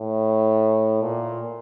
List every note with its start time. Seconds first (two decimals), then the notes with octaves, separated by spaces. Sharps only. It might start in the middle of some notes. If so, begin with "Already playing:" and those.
Already playing: A2
1.02 A#2